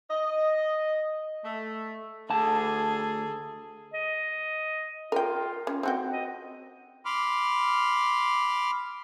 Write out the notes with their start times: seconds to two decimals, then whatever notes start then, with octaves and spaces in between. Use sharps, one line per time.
0.10 D#5
1.45 A3
2.30 D2 G#4 A4 A5
3.94 D#5
5.12 F4 A#4 G5
5.67 C#4
5.83 C4 F#4 G5
6.13 D#5
7.05 B5 C6 D6 F6